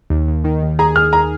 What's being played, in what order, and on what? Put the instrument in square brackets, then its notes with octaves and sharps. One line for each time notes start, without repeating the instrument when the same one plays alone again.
[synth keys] D#2
D#2
D#3
D#2
[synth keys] G#4 [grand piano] A#5
[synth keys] G#4 [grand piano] F6
[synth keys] G#4 [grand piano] A#5